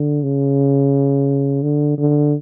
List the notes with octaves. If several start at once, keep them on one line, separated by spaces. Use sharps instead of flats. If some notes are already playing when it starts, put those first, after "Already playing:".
Already playing: D3
C#3
D3
D3